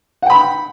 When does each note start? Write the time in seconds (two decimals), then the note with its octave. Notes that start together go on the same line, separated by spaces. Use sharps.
0.22 F#5
0.26 G5
0.30 B5